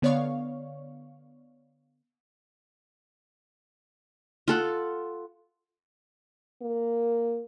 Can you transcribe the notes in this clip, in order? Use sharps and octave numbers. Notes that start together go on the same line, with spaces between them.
D3 B3 C#5 D5 F5 C#6
F4 A4 F#5
A#3